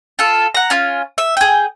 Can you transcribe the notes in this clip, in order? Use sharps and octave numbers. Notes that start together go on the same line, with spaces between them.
F4 A4
F#5 A#5
C#4 F4
E5
G#4 G5